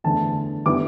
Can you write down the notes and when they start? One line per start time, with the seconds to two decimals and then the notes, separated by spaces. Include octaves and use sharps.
0.04 E2 D3 A3 A5
0.66 D3 G3 B3 E4 D6